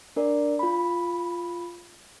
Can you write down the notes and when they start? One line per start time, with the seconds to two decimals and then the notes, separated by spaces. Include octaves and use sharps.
0.16 D4 A#4 D5
0.59 F4 B5